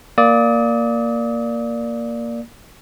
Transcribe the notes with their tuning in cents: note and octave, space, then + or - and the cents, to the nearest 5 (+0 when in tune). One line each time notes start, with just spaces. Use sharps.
A#3 +0 D5 +0 D#6 +40